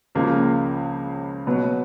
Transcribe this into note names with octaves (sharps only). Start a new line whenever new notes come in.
C#2 C#3 F3 A#3
B2 F#3 B3